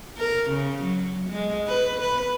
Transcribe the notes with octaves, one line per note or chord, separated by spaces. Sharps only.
A#4
C#3
F#3
G#3
B4
B4